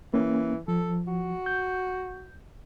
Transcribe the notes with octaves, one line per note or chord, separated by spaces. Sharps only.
E3 A#3 C#4
F3 A4
F#4
G6